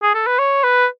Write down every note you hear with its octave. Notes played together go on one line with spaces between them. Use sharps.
G#4
A4
B4
C#5
B4